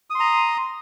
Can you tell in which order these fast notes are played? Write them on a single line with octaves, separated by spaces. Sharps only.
D#6 C6 A#5